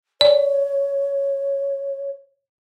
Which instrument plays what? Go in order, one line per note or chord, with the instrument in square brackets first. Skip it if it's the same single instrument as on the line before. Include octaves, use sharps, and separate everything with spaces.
[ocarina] C#5 [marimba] D5